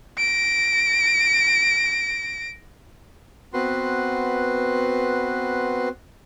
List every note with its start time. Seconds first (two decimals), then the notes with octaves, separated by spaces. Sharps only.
0.18 A#6 D7
3.53 B3 C4 F#4 B4 F#5 C6